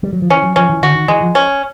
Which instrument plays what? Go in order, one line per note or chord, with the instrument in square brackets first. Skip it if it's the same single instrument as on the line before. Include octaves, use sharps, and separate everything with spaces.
[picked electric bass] G3
F#3
F3
[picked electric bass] E3 [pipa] C#4
[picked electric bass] F#3
[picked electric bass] F3 [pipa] C#4
[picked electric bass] E3
[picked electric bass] D3 [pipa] F#4
[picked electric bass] D#3
[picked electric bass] E3 [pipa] G#3
[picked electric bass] F3
[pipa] C#4